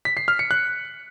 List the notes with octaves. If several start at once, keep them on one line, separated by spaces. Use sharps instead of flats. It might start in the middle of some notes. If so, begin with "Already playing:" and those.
B6
C7
F6
C#7
F#6